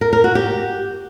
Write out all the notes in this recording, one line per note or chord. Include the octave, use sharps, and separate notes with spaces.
A#4
A#4
F#4
G4